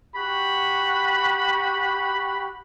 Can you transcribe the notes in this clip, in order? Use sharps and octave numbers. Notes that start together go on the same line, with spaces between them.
F#4 G4 B5